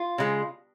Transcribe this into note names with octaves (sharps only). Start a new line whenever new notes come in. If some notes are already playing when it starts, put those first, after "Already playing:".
Already playing: F4
C#3 G#3